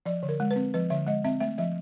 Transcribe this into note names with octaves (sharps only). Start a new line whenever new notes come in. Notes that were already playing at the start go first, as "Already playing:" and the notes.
F3 D5
D3
A#4
G#3
B4
C4
F3 B4
D3 E5
G#3 D#5
C4 E5
A3 E5
F3 E5